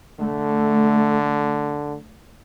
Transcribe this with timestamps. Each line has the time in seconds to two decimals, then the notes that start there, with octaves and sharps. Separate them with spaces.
0.19 D3 A3